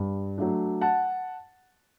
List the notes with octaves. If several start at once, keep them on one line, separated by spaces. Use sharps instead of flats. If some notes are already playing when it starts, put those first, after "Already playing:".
Already playing: G2
F#3 A3 D4
F#5 A5